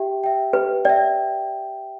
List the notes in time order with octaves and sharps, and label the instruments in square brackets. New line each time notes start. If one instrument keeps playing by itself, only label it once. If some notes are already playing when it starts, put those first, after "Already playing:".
Already playing: [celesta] G4 E5 G5
E5 G5
[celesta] G4 [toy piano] B4
[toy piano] D5 [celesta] E5 G5